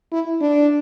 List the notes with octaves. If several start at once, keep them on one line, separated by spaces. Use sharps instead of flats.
E4
D4